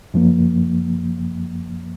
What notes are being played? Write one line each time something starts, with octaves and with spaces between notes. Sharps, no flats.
F#2 F3 A#3